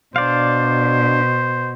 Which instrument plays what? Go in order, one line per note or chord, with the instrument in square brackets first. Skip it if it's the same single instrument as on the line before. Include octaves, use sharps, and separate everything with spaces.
[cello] B2 [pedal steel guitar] D4 D5 F5 [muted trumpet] C5